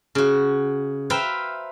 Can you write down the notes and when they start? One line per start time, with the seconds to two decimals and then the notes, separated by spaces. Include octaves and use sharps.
0.15 C#3 F#4
1.10 B4 C5 E5 F5 G5 A#5